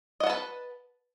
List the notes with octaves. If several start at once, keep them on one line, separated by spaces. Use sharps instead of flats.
B4 D#5 F#5 A5